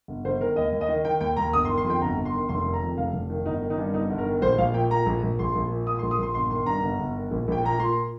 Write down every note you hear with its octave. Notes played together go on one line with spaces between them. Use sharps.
G1
G1 C5
D#3 A#4
D#2 D#5
D#2
D#5
D#3
D#3 G5
D#2 G5
D#2 A#5
G1 D#6
C6
D#3
C6
F2
G5
G1 A#5
G1
C6
D#3
F1 C6
D#3
A#5
F2
F1 F5
F1
D#3
G1 D#4
D#3
D#4
G2
G1 D#4
G1
A#4
D#3
A#1 C5
A#1 F5
A#2 G5
A#2 A#5
A#1
A#1
A#1 C6
A#1
A#2
A#2 D#6
C6
A#1
D#6
A#1 C6
G1 C6
D#3 C6
G2 A#5
G1
G1
D#3
A#1
A#1 G5
A#2 A#5
A#2 C6